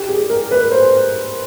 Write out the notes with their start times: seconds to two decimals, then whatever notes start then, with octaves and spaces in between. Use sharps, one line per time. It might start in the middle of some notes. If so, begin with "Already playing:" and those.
Already playing: G4
0.09 G#4
0.30 A#4
0.51 B4
0.72 C5